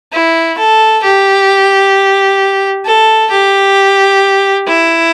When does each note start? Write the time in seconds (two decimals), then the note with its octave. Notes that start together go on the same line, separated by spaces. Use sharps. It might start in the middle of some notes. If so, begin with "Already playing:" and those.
0.13 E4
0.58 A4
1.04 G4
2.86 A4
3.31 G4
4.68 E4